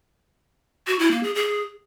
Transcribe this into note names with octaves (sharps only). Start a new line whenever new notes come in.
F#4
E4
A#3
G#4
G#4